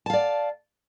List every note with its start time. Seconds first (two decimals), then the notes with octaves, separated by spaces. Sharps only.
0.06 A5
0.10 F5
0.13 D5